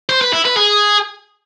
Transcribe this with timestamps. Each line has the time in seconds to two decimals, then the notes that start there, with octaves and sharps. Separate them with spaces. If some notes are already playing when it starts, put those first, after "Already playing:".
0.09 C5
0.21 B4
0.33 E4
0.45 B4
0.57 G#4